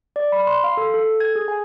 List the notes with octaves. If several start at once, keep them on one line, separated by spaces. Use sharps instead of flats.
D5
B5
C6
F5
A4
A4
G#6
G#4
G#5